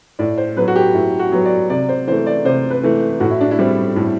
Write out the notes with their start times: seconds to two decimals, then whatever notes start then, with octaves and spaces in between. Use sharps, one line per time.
0.19 A2 D5
0.38 C5
0.57 F#3 B3 B4
0.68 F#4
0.76 G4
0.94 A2 E4
1.19 F#4
1.32 F#3 B3
1.45 D5
1.70 C3 D5
1.89 C5
2.07 E3 A3 C5
2.26 D5
2.45 C3 C5
2.70 B4
2.83 E3 A3
3.20 A2 F#4
3.31 E4
3.41 D4
3.51 E4
3.59 G3 C4
3.96 A2